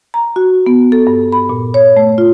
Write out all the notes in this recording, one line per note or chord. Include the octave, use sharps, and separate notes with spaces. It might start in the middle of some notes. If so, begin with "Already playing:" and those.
A#5
F#4
B3
A4
G2
B5
A#2
C#5
A3
F4